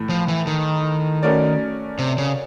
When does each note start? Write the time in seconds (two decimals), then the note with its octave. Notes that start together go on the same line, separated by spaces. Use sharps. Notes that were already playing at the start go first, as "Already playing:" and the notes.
Already playing: A2 E3 A3
0.10 F3
0.28 E3
0.47 D#3
1.23 A3 C#4 F#4 A#4 D5
1.99 C3
2.18 C#3